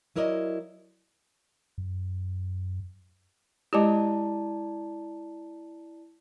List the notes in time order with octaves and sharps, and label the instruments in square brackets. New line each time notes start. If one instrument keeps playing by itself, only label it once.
[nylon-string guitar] F#3 E4 A#4 D5 D#5
[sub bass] F#2
[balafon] G#3 G4 [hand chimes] E4 D5 A5